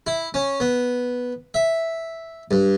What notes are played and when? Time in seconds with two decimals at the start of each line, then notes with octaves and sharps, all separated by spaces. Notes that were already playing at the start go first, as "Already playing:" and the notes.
0.07 E4
0.34 C#4
0.60 B3
1.54 E5
2.51 G2